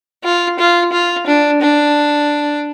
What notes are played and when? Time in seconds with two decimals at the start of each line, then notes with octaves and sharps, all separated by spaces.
0.24 F4
0.59 F4
0.93 F4
1.27 D4
1.61 D4